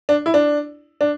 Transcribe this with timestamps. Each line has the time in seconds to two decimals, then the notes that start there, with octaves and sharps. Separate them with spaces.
0.09 D4
0.26 E4
0.34 D4
1.01 D4